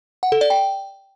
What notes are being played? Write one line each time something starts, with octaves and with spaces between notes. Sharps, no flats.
F#5
A4
D5
G5